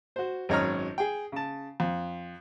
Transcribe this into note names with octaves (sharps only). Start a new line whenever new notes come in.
F#4 C5
G#1 F#2 C#5 D#5 A#5 F6
G#4 G5
C#3 A5
F2